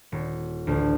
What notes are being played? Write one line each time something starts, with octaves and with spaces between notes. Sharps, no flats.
D#1
A1 D2